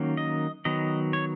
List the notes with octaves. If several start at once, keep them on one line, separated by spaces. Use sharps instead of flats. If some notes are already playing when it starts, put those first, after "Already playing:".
Already playing: D#3 F#3 A#3 C#4
D#5
D#3 F#3 B3 D#5
C#5